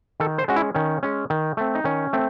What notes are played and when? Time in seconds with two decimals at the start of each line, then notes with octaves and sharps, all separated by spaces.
0.20 D#3 A4
0.38 C5
0.48 G#3 C#4 F#4
0.56 E4
0.75 D#3 C#4
1.03 G#3 C#4
1.30 D#3
1.57 A3 C4
1.75 D#4
1.84 D#3 C#4
2.13 A3 C4